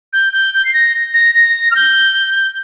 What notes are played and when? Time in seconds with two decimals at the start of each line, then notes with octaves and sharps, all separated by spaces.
0.13 G6
0.33 G6
0.54 G6
0.65 C7
0.74 A#6
1.14 A#6
1.35 A#6
1.71 F6
1.76 G6